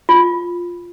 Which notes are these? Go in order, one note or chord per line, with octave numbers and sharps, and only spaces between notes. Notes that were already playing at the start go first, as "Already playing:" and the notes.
F4